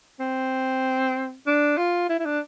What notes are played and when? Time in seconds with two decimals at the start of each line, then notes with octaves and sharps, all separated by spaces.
0.20 C4
1.47 D4
1.77 F4
2.09 E4
2.19 E4
2.25 D4